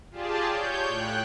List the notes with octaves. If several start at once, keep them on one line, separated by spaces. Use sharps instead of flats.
F4 G4 G#4 D5 A5
C#5 G6
A2 G5 F#6